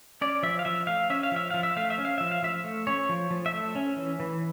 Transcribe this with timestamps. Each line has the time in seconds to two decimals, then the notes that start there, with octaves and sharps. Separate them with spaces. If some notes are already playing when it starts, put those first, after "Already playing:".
0.21 C#4 D5
0.43 F3 E5
0.59 F5
0.65 F3 E5
0.87 A3 F5
1.10 C#4 E5
1.23 F5
1.32 F3 E5
1.50 F3 F5
1.63 E5
1.77 A3 F5
1.90 E5
1.98 C#4
2.05 F5
2.18 F3 E5
2.31 F5
2.43 F3 E5
2.64 A3
2.87 C#4 C#5
3.09 F3
3.31 F3
3.46 E5
3.53 A3
3.75 C#4
3.96 E3
4.20 E3